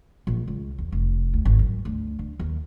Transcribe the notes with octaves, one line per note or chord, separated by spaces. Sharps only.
A#1
C#2
E2
F1
D2
G#1
F#2
D2
D3
D#2